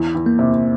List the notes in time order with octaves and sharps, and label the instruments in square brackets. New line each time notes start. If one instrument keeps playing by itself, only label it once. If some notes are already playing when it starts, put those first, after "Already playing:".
Already playing: [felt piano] E2
E2
[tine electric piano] A#3
[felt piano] C3